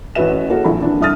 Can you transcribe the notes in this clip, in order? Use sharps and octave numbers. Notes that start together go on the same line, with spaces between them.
A1 C#4 F#4 B4 E5 E7
A#3 C#4 E4 F#4 G#4 A4
A#1 E4 B5
E3 D4
C2 D4 E5 D#6 F6 A6